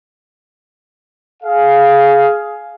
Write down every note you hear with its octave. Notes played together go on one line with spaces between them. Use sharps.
G#4 F5